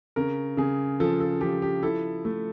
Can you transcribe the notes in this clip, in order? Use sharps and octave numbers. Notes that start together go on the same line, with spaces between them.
C#3 A#4
C#3 G#4
F3 A4
A4
F3 G4
G4
E4 A4
A3